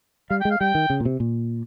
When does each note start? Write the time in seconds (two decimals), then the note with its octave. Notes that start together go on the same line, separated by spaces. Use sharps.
0.30 G3 F5
0.41 G5
0.45 G#3
0.51 F5
0.60 G3 G5
0.75 D#3
0.90 C#3
1.00 A#2
1.05 C3
1.20 A#2